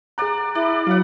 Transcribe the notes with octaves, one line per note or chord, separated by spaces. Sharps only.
G#4 D5 F#5 A#5
E4 D5
F#3 F5 F#5